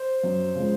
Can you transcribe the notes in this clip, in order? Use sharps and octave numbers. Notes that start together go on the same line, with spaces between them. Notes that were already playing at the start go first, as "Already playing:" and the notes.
Already playing: C5
F#2
C#3 F3 G#3